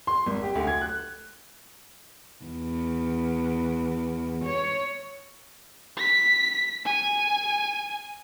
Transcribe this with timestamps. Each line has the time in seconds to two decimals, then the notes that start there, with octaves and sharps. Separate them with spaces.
0.07 C6
0.26 G#1
0.42 G4
0.55 D2
0.67 G#6
0.81 F#6
2.45 E2
4.45 C#5
5.97 B6
6.85 G#5